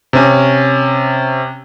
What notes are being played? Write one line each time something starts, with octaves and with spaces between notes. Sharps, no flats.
C3 C#4